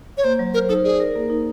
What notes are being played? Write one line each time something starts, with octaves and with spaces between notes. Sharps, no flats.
C#5
A#3 C5
F#3
A#4 C5
D#4 A4
G#4 D5
A#4
A#3
D#4